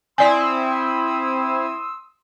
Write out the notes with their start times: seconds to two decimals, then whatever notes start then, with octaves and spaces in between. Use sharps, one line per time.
0.18 C4 E4 D5 G#5 C6 D#6 E6